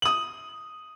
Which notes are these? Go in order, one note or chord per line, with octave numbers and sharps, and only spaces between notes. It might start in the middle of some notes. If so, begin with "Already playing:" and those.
D#6 F#7